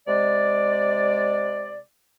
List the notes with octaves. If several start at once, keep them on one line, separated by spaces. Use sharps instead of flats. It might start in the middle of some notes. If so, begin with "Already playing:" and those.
C3 G#3 D5